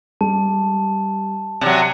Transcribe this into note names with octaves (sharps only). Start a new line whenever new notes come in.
G3 A5
C3 F#3 D5